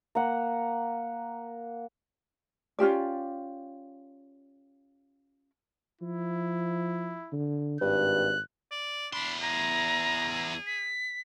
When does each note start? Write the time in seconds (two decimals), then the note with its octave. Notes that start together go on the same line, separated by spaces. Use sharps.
0.15 A#3 F#5
2.79 C#4 F4 G4 D5
6.02 F3 E4
7.32 D3
7.81 G#1 G2 F#6
8.72 D5
9.13 E2 D4 B5 C6
9.41 G#4 A#5
10.67 B6